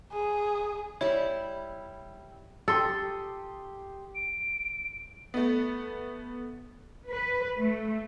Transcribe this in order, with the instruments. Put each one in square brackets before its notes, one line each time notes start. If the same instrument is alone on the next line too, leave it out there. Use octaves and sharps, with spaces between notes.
[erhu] G#4
[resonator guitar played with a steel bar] G3 E4 [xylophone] C#5
[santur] G4 C6 D#6 [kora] A4
[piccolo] D7
[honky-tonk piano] A3 B3
[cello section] B4
A3